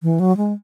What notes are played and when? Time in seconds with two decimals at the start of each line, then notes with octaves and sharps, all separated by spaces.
0.03 E3
0.20 F#3
0.37 G#3